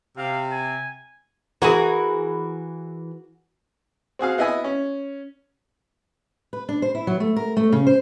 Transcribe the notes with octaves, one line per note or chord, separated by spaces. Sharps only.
C3 F5
G#5
E3 E4 F#4 G#4 A#4
C4 F#4 G#4 F5
B3 E4 D#5 E5 G#5
C#4
B4
D4
C5
E4
F#3
A3
A#4
A3
C#3
C5